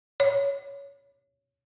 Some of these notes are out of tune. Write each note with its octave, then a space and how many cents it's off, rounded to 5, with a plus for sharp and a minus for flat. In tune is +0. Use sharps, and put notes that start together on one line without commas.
C#5 +10